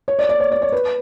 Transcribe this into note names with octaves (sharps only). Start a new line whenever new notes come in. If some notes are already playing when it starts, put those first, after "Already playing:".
C#5
D5
D5
C#5
D5
C#5
B4